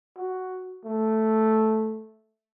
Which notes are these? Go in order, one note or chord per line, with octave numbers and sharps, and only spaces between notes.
F#4
A3